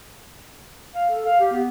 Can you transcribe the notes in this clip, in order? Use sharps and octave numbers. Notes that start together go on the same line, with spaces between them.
F5
A4
F5
G4
B3